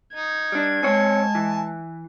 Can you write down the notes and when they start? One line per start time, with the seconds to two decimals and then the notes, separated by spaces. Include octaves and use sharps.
0.15 D#4 G#6
0.52 G3 D4
0.83 G#3 C4 C#5 G#5 A5
1.35 E3